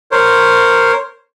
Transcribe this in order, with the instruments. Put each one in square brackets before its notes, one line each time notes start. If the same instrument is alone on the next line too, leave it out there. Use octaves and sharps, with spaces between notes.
[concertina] A#4 C5 C#5